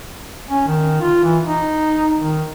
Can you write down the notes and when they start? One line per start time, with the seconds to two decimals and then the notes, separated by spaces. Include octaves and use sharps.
0.49 C#4
0.67 D#3
1.01 F4
1.24 E3
1.44 D#4
2.19 D#3